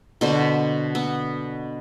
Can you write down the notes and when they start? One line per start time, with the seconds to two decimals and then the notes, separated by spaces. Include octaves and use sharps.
0.21 B2 D3 C5
0.95 B3